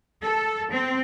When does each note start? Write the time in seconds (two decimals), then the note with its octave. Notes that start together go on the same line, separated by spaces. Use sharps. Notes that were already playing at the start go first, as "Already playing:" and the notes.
0.20 A4
0.69 C4